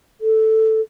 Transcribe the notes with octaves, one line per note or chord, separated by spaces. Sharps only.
A4